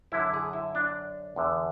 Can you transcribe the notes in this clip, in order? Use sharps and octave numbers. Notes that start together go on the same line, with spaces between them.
F#2 D3 E4
G#4
E4
D4
E2 D3